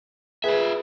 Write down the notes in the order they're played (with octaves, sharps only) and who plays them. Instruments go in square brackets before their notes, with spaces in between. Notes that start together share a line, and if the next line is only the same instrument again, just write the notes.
[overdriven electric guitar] F4 E5 [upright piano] G#4 B4